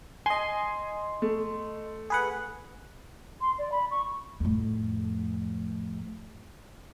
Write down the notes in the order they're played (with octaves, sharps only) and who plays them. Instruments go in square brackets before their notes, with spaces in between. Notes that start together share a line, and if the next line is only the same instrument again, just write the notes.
[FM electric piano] D#5 C6 [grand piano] G#5
[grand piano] A3
[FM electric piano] G#4 B4 F#5
[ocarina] C6
D5
B5
C#6
[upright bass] F2 A2